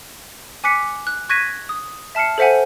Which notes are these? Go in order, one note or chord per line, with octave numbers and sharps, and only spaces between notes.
G#5 D6 F#6 B6 C#7
F#6
C#6 F#6 G#6 A#6 B6 D#7
D#6
E5 A5 F6 C7 C#7
A4 C5 E5 F#5 G#5